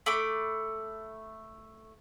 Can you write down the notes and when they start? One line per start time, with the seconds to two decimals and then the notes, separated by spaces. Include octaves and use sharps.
0.06 A3 B5 D6